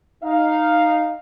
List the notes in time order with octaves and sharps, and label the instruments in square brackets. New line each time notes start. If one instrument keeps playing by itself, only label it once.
[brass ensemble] D#4 F5